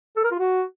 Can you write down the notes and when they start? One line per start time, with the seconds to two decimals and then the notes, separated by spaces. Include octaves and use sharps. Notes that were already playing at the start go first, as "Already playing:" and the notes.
0.17 A4
0.24 A#4
0.31 F4
0.39 F#4